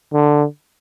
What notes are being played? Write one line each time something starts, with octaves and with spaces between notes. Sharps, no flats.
D3